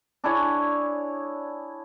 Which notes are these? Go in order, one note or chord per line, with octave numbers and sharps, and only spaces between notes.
D4 E4 G#4 C#5